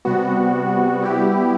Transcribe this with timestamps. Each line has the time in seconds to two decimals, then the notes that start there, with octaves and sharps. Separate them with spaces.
0.05 C3 G3 B3 F#4
1.02 G3 B3 E4 G4